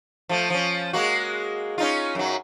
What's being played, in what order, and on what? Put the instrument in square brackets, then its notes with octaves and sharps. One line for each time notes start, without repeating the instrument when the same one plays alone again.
[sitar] F3 A3
F3 C#4
G#3 A#3 F#4
C#4 D#4 F4
F#2 F#3